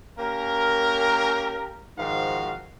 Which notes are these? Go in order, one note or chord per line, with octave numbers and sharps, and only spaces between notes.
A#3 C#4 G4 A#4
G#2 D#3 F3 F#4 F5